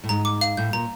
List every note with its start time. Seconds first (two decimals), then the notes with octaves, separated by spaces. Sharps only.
0.04 A2
0.09 G#2 A#5
0.25 D6
0.41 F5
0.57 A2 G6
0.73 A#2 A#5